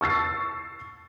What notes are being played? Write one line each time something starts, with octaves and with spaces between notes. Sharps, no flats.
C#6 E6 A6 C7